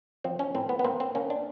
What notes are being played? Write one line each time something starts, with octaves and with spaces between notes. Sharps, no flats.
F3 C4
C#4
A2 C4
B3
B3
A#3 C4
C4
A#3 C#4
D4